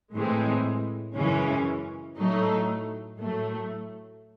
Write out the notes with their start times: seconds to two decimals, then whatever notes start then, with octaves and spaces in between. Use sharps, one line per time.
0.13 A2 E3 G#3 C4
1.16 F#2 C#3 E3 G#3 C#4
2.18 A2 F#3 A3 D#4
3.19 A2 F#3 A3